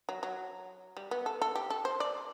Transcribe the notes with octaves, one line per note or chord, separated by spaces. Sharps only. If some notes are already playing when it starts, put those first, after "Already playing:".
F#3
F#3
G3
B3
A4
A4
G4
A4
C5
D5